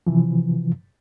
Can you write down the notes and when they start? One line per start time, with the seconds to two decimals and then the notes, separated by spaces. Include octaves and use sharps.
0.07 C3 E3 F3